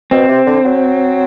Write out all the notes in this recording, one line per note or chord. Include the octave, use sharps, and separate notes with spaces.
B2 C4
C3
D3
F#3